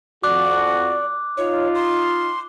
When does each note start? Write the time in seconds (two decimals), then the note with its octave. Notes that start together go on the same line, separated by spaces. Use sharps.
0.24 F2 F#4 D5 D6 F#6
1.37 D#4 F4 C#5
1.75 C6